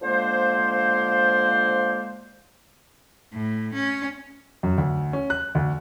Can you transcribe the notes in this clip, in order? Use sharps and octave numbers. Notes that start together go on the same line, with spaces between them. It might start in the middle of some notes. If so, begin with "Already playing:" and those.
D3 F3 G#3 A#3 C5
A2
C#4
F#2
D2
C#4
F#6
D2